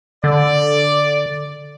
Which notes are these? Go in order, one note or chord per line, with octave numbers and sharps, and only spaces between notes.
D3 D5